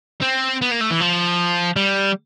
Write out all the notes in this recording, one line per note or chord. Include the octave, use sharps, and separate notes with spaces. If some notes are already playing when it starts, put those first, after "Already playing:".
C4
B3
A#3
A3
E3
F3
G3